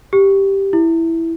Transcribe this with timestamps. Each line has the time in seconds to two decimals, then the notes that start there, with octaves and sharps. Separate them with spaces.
0.13 G4
0.73 E4